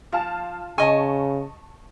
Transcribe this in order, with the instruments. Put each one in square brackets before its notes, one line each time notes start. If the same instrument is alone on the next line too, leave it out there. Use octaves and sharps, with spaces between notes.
[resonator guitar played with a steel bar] F3 [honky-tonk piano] F4 F5 A5
[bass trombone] C#3 [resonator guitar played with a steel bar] D#5 G#5 [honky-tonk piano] A5 C#6